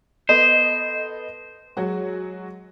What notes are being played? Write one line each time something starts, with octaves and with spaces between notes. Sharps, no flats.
B3 A4 C5 D#5
F#3 G#3 F#4